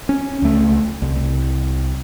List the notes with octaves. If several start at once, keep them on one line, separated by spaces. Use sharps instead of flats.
C#4
C#2 A3
C2